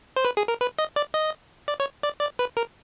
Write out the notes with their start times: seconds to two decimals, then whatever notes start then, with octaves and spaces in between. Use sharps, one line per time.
0.16 C5
0.25 B4
0.37 G#4
0.48 A#4
0.61 B4
0.78 D#5
0.96 D5
1.14 D#5
1.68 D5
1.80 C#5
2.03 D5
2.21 D5
2.39 B4
2.57 A#4